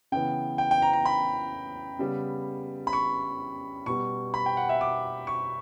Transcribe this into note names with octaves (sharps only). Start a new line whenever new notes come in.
C#3 E3 B3 G5
G5
G5
A#5
A#5
B5
C#3 G3 B3
B5
C#6
B2 G3 B3 C#6
B5
G5
F#5
E5
D6
C#6